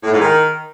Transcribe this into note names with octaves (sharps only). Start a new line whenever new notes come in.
A2
G#2
D#3